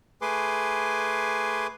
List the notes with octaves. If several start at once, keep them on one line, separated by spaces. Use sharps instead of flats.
A3 G#4 B4 G#5 C6 D6